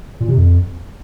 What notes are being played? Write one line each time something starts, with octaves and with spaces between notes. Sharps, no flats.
A#2
C3
F2